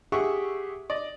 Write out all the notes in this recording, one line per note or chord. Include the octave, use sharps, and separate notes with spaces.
G4 G#4 E5 F#5 C#6
D5 D#5